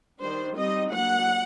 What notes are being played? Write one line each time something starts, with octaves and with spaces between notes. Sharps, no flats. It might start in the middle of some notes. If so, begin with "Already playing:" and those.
D#3 G3 D4 C5
G3 C4 D#4 D#5
F#3 A#3 D4 F#5